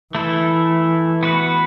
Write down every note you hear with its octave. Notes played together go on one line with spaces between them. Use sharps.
E3 A3 E4 A4
B3 F#4 B4